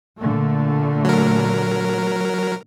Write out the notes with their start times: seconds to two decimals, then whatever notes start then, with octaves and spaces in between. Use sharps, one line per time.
0.19 A#2 D3 A3
1.05 F#3 A#4